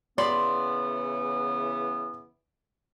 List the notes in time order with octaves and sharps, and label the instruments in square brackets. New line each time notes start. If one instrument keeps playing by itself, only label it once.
[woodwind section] C#3 E3 B3 [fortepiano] D5 B5 [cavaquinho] C6